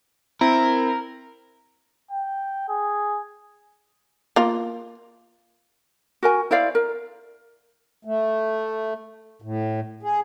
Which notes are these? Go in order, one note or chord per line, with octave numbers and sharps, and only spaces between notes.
C4 E4 A#4
G5
G#4
A#3 F4
F#4 A#4 G#5
E4 C5 D5 F5
A#4
A3
A2
G#4